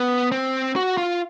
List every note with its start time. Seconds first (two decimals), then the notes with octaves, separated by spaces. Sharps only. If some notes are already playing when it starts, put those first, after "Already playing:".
Already playing: B3
0.32 C4
0.76 F#4
0.97 F4